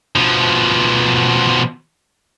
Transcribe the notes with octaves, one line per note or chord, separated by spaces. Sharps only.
B2 F3